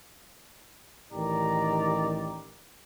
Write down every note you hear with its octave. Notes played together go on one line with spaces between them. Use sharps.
A1 D#3 G4 D5 A#5